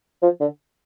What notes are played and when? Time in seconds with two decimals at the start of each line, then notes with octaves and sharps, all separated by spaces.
0.22 F3
0.40 D3